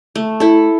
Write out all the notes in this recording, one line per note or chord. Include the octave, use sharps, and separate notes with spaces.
A3
E4 A4